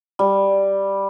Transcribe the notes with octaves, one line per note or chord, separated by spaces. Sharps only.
G3